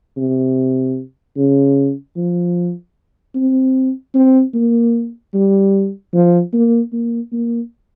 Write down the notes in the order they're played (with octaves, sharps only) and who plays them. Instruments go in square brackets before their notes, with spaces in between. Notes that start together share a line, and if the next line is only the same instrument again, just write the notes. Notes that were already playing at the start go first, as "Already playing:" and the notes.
[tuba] C3
C#3
F3
C4
C4
A#3
G3
F3
A#3
A#3
A#3